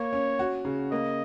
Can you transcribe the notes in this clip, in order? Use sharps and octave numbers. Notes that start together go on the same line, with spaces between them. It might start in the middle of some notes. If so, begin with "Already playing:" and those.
Already playing: A#3 C#5
C#4
F#4
C#3
A#3 D#5